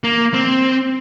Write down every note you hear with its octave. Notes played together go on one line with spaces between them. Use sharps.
A#3
C4